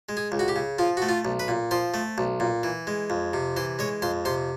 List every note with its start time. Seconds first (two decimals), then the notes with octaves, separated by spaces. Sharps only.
0.09 G#3
0.17 G#4
0.32 C#2
0.39 F#4
0.48 G4
0.56 C#3
0.79 F3 F4
0.97 A3 F#4
1.09 F4
1.25 B1
1.39 B4
1.48 A#2
1.71 F3 C5
1.94 A3
2.18 B1
2.40 A#2
2.63 E3
2.87 G#3
3.10 F2
3.33 C3
3.57 E3 C5
3.79 G#3 C#5
4.02 F2 C5
4.25 C3 C5